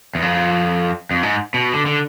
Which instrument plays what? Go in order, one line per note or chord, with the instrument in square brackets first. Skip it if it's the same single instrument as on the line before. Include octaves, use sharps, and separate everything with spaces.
[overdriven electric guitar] E2
F2
F2
G#2
B2
D3
D3